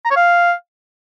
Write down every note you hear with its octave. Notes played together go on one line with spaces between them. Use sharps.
A#5
C#5
F5